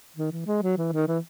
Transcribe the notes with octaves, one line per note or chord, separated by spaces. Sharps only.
D#3
E3
G#3
F#3
E3
D#3
E3